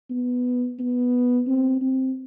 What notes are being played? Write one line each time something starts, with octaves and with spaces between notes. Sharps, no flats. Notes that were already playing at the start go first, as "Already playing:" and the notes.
B3
B3
C4
C4